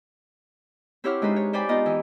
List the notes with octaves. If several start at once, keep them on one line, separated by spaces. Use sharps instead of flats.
C4 E4 G4 C#5 F#5 F6
G#3 D4 D#4 B4 C5
C#5
G4 C5 D5 G5 G#5 B5
B3 D#4 F4 D#5
E3